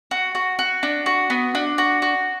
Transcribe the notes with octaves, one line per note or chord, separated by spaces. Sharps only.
F#4
F#4
F#4
D4
F#4
B3
D4
F#4
F#4